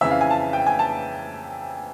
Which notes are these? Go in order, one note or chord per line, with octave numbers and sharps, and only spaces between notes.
F2 C#3 E3 E5
F5
G#5
A5
G5
G#5
A5